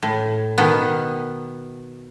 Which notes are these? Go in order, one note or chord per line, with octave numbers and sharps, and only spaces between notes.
A2
B2 D#3 B3